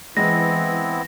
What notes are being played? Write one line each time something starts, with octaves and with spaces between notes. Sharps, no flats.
E3 G#3 B3 C4 E4 A#6